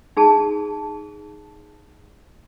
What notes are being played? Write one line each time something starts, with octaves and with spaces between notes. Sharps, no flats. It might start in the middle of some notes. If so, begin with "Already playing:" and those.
D#4 G#4 A5